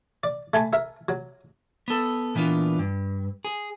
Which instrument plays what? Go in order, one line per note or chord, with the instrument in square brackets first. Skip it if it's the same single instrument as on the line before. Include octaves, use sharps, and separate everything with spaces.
[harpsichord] D5
A3 G#5 A5 B5
A#4 E5
F#3
[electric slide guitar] B3 A4
A#2 E3 B3 D4 F4
G2
G#4